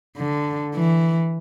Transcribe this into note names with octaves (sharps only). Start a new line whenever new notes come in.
D3
E3